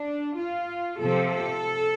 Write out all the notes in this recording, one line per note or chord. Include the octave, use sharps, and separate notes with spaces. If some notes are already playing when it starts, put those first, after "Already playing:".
Already playing: D4
F4
C3 F3 C4 A4
A4